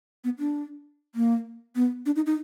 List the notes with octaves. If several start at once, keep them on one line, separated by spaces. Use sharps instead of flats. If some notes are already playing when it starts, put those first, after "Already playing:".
B3
D4
A#3
B3
D4
D#4
D#4